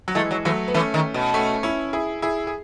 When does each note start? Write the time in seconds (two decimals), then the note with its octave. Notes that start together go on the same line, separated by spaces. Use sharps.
0.08 F#3
0.15 E3 G#3 A3
0.31 F#3
0.45 E3 F#3 A3
0.68 B3
0.74 E3 A3 C#4
0.94 D#3
1.14 B2
1.34 A3 C#4
1.63 C#4 E4
1.93 E4 G#4
2.22 E4 G#4
2.47 G#4